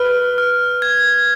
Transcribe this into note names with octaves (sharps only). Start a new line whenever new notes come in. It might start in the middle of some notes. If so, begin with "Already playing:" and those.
Already playing: B4 F6
F6
G#6